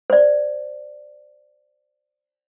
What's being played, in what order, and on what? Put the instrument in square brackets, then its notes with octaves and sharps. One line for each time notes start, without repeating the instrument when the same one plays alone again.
[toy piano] C5 D5